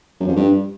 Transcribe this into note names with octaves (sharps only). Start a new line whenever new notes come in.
F#2
F2
G2